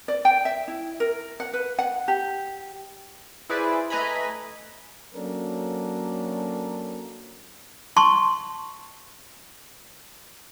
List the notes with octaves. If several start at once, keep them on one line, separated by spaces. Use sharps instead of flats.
D5
G5
E5
E4
A#4
F#5
B4
F#5
G4
E4 G#4 B4 C5 D5 E5
A3 B4 D#5 G#5 A#5 B5
F#3 A#3 C#4 D4 A4 A#4
A5 C6 C#6